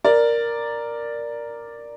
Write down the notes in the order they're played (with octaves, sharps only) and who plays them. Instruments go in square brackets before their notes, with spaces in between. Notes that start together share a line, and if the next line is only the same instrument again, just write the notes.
[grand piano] A#4 D5